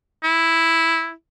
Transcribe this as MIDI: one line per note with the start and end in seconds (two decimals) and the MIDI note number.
0.24 1.11 64